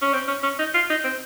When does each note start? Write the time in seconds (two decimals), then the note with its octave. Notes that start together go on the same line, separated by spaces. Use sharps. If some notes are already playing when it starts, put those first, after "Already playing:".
0.02 C#4
0.13 C4
0.28 C#4
0.43 C#4
0.59 D#4
0.74 F4
0.90 D#4
1.04 C4